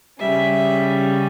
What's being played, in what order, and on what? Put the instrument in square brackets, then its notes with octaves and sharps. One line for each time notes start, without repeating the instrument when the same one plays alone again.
[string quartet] C#3 G3 C#4 E5